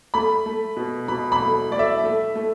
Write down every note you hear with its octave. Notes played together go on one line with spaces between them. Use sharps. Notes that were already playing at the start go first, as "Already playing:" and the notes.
A3 B5
A3
B2
B2 B5
B5
A3
A3 D5
E5
A3
A3